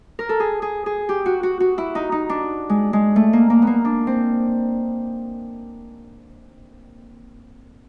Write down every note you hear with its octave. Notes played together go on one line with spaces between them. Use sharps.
A#4
A4
G#4
G#4
G#4
G4
F#4
F#4
F#4
E4
D#4
D#4
D4
G#3
G#3
A3
A#3
A#3
B3
A#3
D4
C4